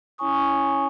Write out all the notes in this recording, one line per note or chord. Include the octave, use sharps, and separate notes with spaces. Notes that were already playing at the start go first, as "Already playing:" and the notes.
C#4 E4 C#5 G#5 C#6 D#6